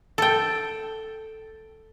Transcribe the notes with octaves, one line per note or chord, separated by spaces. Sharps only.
A4 G5